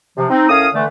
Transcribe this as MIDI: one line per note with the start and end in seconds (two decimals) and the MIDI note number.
0.17 0.25 48
0.17 0.25 53
0.30 0.47 60
0.30 0.47 63
0.49 0.67 45
0.49 0.67 61
0.49 0.67 70
0.49 0.67 77
0.49 0.67 87
0.73 0.85 50
0.73 0.85 52
0.73 0.85 57